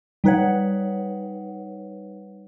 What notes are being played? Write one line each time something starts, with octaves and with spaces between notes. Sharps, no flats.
G3 D#4 B4 C#5 F#5